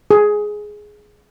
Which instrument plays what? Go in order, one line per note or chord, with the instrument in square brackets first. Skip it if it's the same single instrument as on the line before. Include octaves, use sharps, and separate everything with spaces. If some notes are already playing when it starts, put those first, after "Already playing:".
[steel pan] G#4